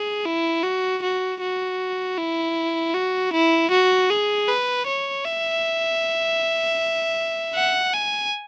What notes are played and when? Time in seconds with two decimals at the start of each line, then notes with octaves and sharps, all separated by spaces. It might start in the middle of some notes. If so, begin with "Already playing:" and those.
Already playing: G#4
0.25 E4
0.63 F#4
1.02 F#4
1.41 F#4
2.18 E4
2.94 F#4
3.33 E4
3.70 F#4
4.10 G#4
4.48 B4
4.87 C#5
5.25 E5
7.55 F#5
7.94 G#5